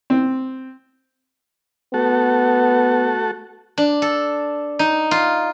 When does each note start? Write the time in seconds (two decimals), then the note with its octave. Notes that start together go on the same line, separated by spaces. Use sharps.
0.10 C4
1.94 A3 B3 F#4 A4
3.78 D4
4.02 A4
4.79 D#4
5.11 F4